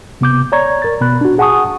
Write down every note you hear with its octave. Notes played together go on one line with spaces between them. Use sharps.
C3 B3 D6 G6
C#5 D5 A#5 C#6 G#6
A#4 A6
B2 B3 B5 F#6
D4 F#4
G#4 F#5 G#5 A5 C#6 D#6